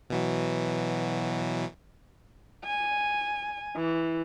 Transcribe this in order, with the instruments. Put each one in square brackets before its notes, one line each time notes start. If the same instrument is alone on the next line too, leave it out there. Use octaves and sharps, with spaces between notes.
[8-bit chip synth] B2 E3 F#3
[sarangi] G#5
E3